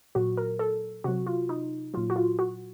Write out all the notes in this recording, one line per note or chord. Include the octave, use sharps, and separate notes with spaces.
A#2 F#3 F#4
A#4
A4
C3 F#3 F#4
F4
D#4
A#2 F#3 F4
F#4
F4
F#4